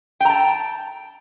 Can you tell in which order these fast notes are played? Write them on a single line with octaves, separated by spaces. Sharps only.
G5 A#5 A5